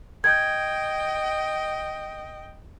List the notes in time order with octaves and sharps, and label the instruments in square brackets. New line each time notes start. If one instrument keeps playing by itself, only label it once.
[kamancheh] D#5 G5 [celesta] G6 G#6